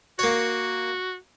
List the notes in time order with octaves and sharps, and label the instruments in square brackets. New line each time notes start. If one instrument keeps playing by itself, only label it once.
[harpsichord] A#3 C#5 [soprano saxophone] F#4